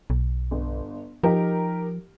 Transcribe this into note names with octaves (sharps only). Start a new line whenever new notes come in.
B1
G1
F3 D#4 G4 A#4